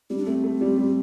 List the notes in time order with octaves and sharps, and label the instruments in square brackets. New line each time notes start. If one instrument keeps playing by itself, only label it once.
[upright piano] G3 [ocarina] C4
[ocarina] D4
[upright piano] A3 [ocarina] C4
[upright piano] A3
G3
G3